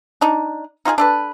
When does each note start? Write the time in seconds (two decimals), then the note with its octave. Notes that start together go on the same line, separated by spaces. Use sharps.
0.21 D4 D#4
0.85 D#4 F4 G4 G#4
0.98 D4 A4 B4